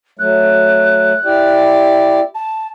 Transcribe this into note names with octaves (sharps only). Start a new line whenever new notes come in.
F#3 A3 F#6
E4 G4 D5
A5